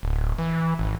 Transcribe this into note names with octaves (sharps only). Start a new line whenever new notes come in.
D1
E3
G#1